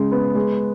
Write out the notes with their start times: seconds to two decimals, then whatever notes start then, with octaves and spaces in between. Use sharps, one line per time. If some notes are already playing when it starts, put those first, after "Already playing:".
Already playing: C#3 G#3
0.12 B3
0.35 G#3